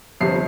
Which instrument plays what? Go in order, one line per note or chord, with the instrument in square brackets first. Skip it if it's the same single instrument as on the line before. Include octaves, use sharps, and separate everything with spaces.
[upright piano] G1 F2 C3 G3 C7